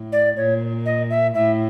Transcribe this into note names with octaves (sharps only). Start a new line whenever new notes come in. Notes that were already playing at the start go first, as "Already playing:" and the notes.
Already playing: A2
D5
A#2 C#5
D#5
E5
A2 E5